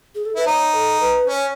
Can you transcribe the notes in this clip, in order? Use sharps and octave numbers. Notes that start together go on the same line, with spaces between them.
G#4
A4
E4 B4
D#4 C#5
A4
B4
C#4 C#5